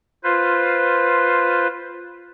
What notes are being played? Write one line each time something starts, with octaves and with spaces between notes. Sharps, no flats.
F4 B4 C5